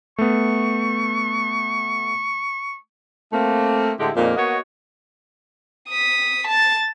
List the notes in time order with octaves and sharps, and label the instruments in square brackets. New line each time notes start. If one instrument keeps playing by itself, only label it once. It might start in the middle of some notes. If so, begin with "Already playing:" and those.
[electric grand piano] A3 B3 [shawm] C#6
[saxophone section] A3 A#3 C4
A2 D3 G#3 E4 G4
F2 A#2 G#3 A#3 D#4 D5
A#3 B3 F#4 C#5 D#5
[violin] D#6 B6
A5 A6